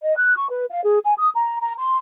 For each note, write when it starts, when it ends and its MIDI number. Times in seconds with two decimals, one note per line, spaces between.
0.02 0.15 75
0.17 0.34 90
0.36 0.47 85
0.49 0.65 71
0.70 0.82 77
0.84 0.99 68
1.05 1.14 80
1.18 1.30 87
1.34 1.58 82
1.60 1.73 82
1.77 1.97 84